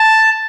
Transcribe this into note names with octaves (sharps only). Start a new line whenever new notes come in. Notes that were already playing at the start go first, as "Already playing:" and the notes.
Already playing: A5